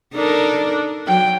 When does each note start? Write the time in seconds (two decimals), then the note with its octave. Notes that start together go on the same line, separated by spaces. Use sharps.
0.14 D4 D#4 A4 A#4
1.07 F#3 G5